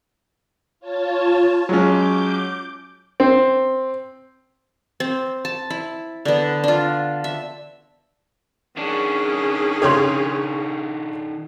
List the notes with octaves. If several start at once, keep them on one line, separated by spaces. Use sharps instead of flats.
F4 C#5 A5
F#3 G#3 C#4 D6 G6
C4
C4
A5
E4
D3 B3
D4 F4
E5
D#3 C#4 D4 G#4
C#3 G4 A4 C#5 C6